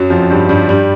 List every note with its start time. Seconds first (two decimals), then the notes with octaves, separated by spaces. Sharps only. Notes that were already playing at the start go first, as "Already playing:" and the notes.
Already playing: F#2 F#3
0.10 F2 F3
0.30 G2 G3
0.49 G2 G3
0.69 G2 G3